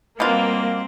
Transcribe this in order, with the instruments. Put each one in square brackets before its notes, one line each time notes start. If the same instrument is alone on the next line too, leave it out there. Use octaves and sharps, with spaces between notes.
[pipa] B2 F4 [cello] G3 C4 [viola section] A#3